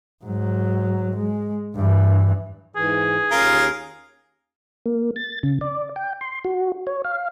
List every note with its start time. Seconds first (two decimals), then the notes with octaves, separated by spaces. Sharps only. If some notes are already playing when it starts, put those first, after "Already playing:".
0.24 G#2 F#3
1.17 G#3
1.76 G2 E3
2.76 G#2 E3 G#4
3.32 D#2 C#4 F4 A#4
4.86 A#3
5.16 A6
5.43 C#3
5.61 D5
5.96 G5
6.21 C6
6.45 F#4
6.87 C#5
7.05 F5